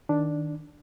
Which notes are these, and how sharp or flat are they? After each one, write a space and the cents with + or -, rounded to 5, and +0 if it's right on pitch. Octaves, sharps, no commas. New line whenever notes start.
D#3 +0 D4 +0